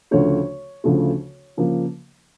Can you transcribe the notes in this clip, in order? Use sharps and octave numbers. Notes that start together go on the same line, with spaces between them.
D2 C#3 F3 A3 C#5
D2 C#3 F3 A3
C#3 F3 A#3